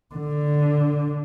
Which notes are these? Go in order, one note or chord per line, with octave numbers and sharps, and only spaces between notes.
D3